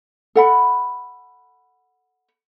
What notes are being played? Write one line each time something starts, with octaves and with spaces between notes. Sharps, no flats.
A4 F#5 B5